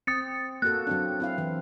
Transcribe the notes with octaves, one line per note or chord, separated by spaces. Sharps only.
C4 D#6 A6 C#7
A#3 F#4 A4 F#6
F#3 C4 D4
C4 E4 F5
E3